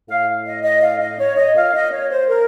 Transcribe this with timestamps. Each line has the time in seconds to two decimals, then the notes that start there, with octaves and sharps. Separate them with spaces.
0.09 A2 F5
0.46 D#5
0.63 D#5
0.82 F5
1.00 D#5
1.19 C#5
1.37 D#5
1.55 A#2 F5
1.74 D#5
1.92 C#5
2.10 C5
2.28 A#4